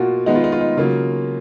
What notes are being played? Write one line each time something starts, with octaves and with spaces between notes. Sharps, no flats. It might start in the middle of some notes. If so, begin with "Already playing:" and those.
Already playing: B2 A#3 F4 F#4
D#3 G#3 B3 D#4
F4
D#4
F4
D#4
C#3 F#3 A#3 F4